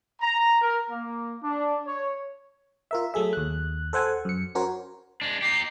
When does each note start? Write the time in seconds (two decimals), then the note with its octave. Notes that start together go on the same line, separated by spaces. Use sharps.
0.21 A#5
0.60 A#4
0.90 A#3
1.42 D4
1.86 C#5
2.91 F4 A#4 E5
3.14 F#3 A3 G#4 E5
3.33 D#2 F#6
3.93 A4 C5 F#5 G#5
4.25 F#2 C#7
4.55 C#4 F#4 A#4 C5 C#5
5.22 G#3 D4
5.42 D#4 G4 C7